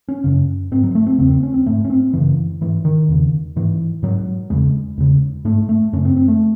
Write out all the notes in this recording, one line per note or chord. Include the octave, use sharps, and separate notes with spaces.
C#4
F#2 C#3
G#2 C4
F#3
A3
C4
E2 C#3 C4
C4
C#4
C4
G#2 A3
C#4
C4
F#2 C#3 E3
G#2 E3
D#3
E2 C#3
G#2 E3
G#2 F#3
E2 C#3 G#3
E2 C#3
G#2 A3
A3
F#2 C#3 C#4
C4
C4
A3